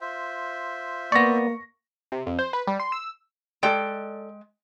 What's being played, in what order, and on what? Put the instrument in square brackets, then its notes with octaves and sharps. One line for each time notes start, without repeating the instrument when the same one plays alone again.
[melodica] F4 C5 E5
[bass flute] A#3 [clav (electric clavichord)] B3 D5 [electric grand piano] C#6 A#6
[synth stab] C3
F2
C5
B4
G3
C6
E6
[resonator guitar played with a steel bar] G#3 G5 [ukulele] A4 D5